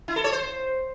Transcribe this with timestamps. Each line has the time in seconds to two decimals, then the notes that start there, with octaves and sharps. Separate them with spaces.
0.08 E4
0.16 A4
0.24 C#5
0.32 C5